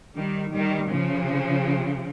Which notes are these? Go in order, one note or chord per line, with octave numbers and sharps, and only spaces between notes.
D#3 G3
D#3 G3
C#3 F3